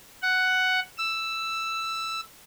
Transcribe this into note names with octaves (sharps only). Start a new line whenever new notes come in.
F#5
E6